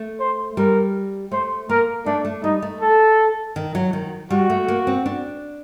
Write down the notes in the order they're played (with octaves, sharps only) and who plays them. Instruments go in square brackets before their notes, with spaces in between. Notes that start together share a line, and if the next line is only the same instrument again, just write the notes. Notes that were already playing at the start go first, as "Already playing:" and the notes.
Already playing: [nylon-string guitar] A3
[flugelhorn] C5
[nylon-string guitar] G3 [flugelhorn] A#4
[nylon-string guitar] A3 [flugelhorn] C5
[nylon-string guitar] A#3 [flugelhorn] A#4
[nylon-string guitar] A3 [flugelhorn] D4
[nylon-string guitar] A3
[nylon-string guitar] G3 [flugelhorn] D#4
[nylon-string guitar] A3
[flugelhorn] A4
[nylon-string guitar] D#3
F#3
D#3
[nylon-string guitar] G3 [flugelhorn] F#4
[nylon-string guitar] A3
A#3
C4
D4